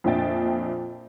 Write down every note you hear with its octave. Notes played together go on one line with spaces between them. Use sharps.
F2 A#2 D4 E5 G5 A6